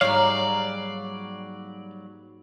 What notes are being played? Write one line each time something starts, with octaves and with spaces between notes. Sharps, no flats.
G#2 F#3 G3 A#3 C#5 D5 F5